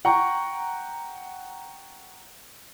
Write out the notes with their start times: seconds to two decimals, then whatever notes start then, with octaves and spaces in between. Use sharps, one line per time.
0.05 F#5 G5 A#5 C#6